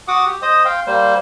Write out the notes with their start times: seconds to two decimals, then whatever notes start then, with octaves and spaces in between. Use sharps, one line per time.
0.08 F#4 F#5 D6 D#6
0.26 G4
0.42 C5 D#5 D#6
0.65 F5 G5 C6
0.87 G3 A#3 C5